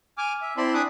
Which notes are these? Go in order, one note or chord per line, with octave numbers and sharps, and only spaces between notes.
G#5 D6 F6
E5
C4 E4 D5 A5 B5 C6
D4 G#5 B5 D6 D#6 F#6